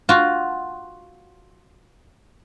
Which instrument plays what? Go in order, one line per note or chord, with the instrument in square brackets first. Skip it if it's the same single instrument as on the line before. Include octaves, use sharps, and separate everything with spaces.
[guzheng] F4 F#4